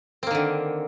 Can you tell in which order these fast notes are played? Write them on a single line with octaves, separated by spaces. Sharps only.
C4 A#3 D#3 D3